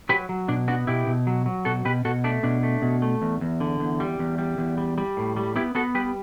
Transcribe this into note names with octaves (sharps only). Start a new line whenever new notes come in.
F#3 G4 B4
F#3
B2 D4
B3 D4 F#4
B2 E4 G4
B2
F#3
F#3
B2 F#4 A4
B2 G4 B4
B2 F#4 A4
A3 D4
B2 D4
A3
B2
A3
E2
E2
D3
E2
G3
E2
G3
E2
G3
G3
A2
G3
B3 E4 G4
B3 F#4 A4
G3 G4 B4